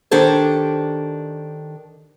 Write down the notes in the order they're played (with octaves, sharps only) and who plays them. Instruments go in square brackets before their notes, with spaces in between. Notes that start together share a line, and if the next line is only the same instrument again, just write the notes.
[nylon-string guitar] D#3 D4 G4 A4 C5 C#5